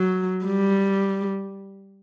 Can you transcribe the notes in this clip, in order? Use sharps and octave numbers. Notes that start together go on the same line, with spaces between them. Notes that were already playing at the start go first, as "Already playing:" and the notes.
Already playing: F#3
G3